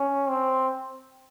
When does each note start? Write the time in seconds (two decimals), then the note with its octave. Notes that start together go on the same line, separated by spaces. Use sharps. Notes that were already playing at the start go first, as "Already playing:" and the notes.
Already playing: C#4
0.29 C4